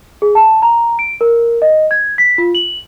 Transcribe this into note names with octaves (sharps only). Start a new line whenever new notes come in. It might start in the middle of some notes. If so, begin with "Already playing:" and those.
G#4
A5
A#5
D7
A#4
D#5
G#6
B6
F4
F#7